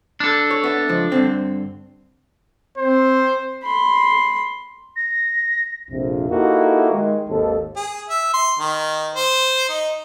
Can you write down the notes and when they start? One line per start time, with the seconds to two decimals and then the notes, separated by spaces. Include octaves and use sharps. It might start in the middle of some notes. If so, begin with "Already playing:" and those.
0.20 D4 A4
0.51 C#5
0.64 B3 E5
0.89 C#2 F3
1.12 G2 D3 C4
2.78 C4 C5
3.64 B5 C6
4.96 A#6
5.90 A#1 F2 C3
6.29 A#3 D#4 E4 F#4 G4 A4
6.92 D#3 G#3
7.28 G#1 D#2 A4
7.77 G#4
8.10 E5
8.34 C6
8.59 D#3
9.14 C5
9.69 D#4